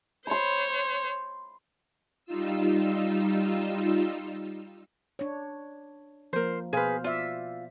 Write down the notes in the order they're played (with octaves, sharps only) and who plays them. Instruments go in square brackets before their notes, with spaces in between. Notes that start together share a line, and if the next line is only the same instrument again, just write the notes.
[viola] C5 C#5 [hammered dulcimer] B5 C6
[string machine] G3 D#4 F4 E6
[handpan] D4 C#5
[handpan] F3 A#3 [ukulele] A#4 C5
[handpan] B2 C5 F5 [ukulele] G#4 B4
[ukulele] F4 [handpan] D5 E5